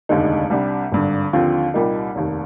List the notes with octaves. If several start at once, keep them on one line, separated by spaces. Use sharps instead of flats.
F1 D#2 D3 G#3 D#4
C2 C3 G3 D4
G#1 G2 D3
D#2 D3 F3 C4 F4
C2 A#2 G3 A#3 D#4
F1 D#2 D#3